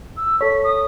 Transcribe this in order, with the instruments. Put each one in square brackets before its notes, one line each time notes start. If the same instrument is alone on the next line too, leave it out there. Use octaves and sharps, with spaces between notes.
[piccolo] E6
[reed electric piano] A4 C#5 [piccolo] B6
[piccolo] D#6